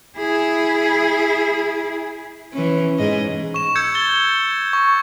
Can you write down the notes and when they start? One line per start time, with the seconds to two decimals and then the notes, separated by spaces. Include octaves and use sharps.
0.17 E4 G#4
2.53 E3 C#4
2.99 G#2 G#4 D#5
3.54 C#6 E7
3.75 E6 G6 G#6 C#7
3.95 A6 G7
4.73 C#6